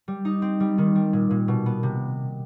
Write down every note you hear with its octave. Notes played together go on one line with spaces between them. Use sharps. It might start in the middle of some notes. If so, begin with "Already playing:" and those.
G3
D#4
C4
G3
D#3
G3
A#2
A#2
B2
B3
C3